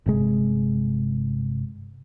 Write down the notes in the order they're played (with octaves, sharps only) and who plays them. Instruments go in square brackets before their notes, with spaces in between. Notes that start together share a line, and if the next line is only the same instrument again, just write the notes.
[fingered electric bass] G1 C3 G#3